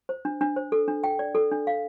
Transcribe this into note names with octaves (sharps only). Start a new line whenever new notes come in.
C5
D4
D4
C5
A4
D4
G5
D5
A4
D4
F5